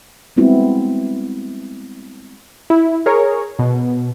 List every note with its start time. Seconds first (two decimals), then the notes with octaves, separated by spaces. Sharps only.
0.37 G3 G#3 B3 C4 E4 F#4
2.70 E4
3.06 G#4 A#4 C#5
3.59 B2